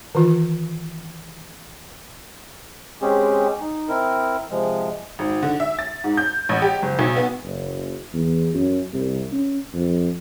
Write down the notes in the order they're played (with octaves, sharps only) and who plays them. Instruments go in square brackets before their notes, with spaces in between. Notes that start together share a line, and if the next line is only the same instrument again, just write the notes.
[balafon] D#3 E3 F4
[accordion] G#3 C4 C#4 G4 G#4
D#4
C4 E4 A#4
C3 F3 G#3
[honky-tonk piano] G#1
D3
E5
A6
G#2
G6
A1
G4
F#1
B1
B3
[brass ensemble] F#1
E2
F#2
C2
C#4
F2